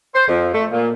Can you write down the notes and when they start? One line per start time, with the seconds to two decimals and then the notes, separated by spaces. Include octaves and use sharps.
0.14 C5
0.27 F2
0.53 A3
0.71 A#2